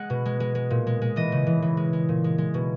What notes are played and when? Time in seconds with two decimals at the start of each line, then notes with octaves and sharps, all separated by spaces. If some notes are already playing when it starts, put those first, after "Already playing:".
Already playing: G#3 F#5
0.10 B2
0.26 G#3
0.40 G#3
0.55 G#3
0.70 A#2
0.87 G#3
1.02 G#3
1.16 E3 D#5
1.32 C#3
1.47 E3
1.62 E3
1.77 G#3
1.93 G#3
2.09 A#2
2.24 G#3
2.38 G#3
2.54 B2